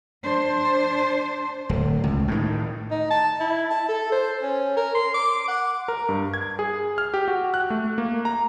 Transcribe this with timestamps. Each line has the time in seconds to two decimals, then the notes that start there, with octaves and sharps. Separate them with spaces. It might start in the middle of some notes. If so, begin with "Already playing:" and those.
0.23 D4 C5
1.69 D1
2.04 C#2
2.28 A2 D#3
2.91 D#4
3.10 A5
3.40 E4
3.70 A5
3.89 A4
4.12 C5
4.42 C#4
4.77 A#4
4.95 C6
5.14 D6
5.48 F#5
5.88 A#4
6.09 G2
6.34 G#6
6.59 G#4
6.98 F6
7.14 G4
7.28 F#4
7.54 F#6
7.70 A3
7.98 A#3
8.25 A#5